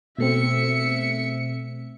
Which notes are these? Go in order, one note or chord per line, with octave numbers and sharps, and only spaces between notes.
B2 A3 C4 E5 C#7